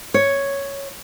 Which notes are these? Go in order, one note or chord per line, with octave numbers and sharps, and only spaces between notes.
C#5